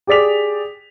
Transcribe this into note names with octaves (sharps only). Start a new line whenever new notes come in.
G4 G#4 D5 B6 F7